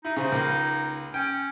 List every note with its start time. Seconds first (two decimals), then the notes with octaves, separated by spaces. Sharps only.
0.05 D#4 E4
0.16 C#3 D#4 C5
0.32 C#2 A#3
1.14 C#4 G5